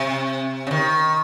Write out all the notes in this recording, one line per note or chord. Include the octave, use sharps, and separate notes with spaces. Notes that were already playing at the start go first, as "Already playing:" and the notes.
Already playing: C3
C#3
D#3